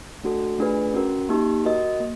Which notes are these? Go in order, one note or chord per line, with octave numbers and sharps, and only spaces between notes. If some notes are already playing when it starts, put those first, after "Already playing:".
A3 D4 F#4 A4
A3 D4 F4 G#4 B4
C#4 F#4 A#4
A#3 D#4 G4
F#4 A#4 D#5
A#3